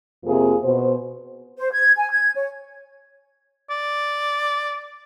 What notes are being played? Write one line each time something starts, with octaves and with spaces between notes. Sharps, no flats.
F2 C3 F3 A#3 G#4
B2 C5
C5
G#6
G#5
G#6
C#5
D5